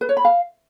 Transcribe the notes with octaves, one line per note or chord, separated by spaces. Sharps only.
B4
C#5
B5
F5